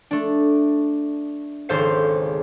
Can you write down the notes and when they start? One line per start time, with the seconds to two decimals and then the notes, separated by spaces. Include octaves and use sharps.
0.11 A3 D4
1.69 G#1 C#2 A4 C5 F5 C7